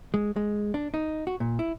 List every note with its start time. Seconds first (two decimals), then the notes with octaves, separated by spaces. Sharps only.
0.14 G#3
0.36 G#3
0.74 D4
0.94 D#4
1.27 F#4
1.40 A#2
1.59 E4